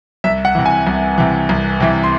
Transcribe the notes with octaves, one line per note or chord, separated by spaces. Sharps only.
C2 E5
F#5
C3 E3
G#5
C2
C3 E3
C2
C3 E3
C6